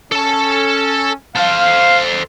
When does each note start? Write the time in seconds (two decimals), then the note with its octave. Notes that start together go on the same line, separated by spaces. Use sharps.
0.12 C#4 A4 A5
1.36 A4 C5 F5